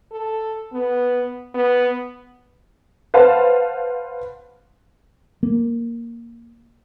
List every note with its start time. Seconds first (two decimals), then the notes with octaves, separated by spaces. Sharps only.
0.12 A4
0.73 B3
1.55 B3
3.14 B4 C5 F5 F#5 A5
5.43 A#3